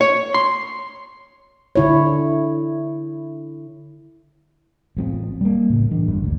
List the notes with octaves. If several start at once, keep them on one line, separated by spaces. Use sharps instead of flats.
C#5
C6
D3 E4 C#5
A1 F3 C4
G3 A#3
A2 C#3
E3 D4
G1 G#2 G3
D2